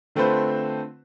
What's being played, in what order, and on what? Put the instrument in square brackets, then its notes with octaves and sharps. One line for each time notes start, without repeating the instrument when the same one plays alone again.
[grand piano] D3 A3 C4 F4 B4 C5